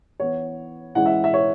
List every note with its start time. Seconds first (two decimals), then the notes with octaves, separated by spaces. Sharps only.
0.20 E3 B3 E4 C#5
0.95 E3 G#3 C#4 E4 F#5
1.06 E5
1.24 E5
1.34 C#5